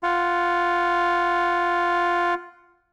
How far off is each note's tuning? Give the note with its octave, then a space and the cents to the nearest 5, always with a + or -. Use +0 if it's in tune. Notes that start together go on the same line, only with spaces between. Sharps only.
F4 +0 F#5 +0